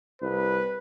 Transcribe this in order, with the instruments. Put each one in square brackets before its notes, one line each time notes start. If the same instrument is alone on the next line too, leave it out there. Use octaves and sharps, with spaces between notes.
[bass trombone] C2 [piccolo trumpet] B4